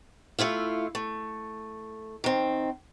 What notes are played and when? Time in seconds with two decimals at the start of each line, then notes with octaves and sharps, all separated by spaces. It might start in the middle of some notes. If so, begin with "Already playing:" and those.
0.39 A3 E4 F4 F5
0.95 A3
2.24 D#3 C4